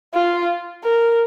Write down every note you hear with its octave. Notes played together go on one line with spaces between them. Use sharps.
F4
A#4